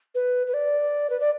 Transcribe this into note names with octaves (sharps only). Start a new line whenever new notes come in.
B4
B4
D5
B4
D5